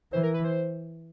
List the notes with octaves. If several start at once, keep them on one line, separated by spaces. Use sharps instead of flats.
E3 C5
A#4
B4
C5